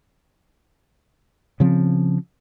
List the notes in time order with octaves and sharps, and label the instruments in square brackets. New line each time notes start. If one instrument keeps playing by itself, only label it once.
[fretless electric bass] C#3 F3 C4